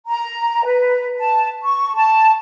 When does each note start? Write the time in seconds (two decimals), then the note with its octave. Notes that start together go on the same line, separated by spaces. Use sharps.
0.07 A#5
0.65 B4
1.18 A5
1.63 C#6
1.96 A5